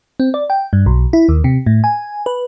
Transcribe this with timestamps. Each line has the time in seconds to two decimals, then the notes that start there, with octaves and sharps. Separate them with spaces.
0.20 C4
0.34 D5
0.50 G5
0.73 G2
0.86 B1
1.13 E4
1.29 D#2
1.44 C3
1.66 A2
1.84 G#5
2.26 B4